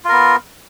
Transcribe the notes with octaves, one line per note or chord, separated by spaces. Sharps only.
B3 F4 A#4